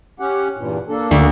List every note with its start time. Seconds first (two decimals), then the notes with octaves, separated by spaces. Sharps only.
0.20 C#4 G4 F#5
0.57 E2 G2 A#2
0.89 A#3 D4 A4
1.11 D2